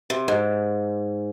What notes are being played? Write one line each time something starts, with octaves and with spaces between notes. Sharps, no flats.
C3
G#2